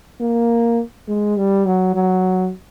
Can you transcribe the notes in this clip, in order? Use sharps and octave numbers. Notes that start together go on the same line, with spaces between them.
A#3
G#3
G3
F#3
F#3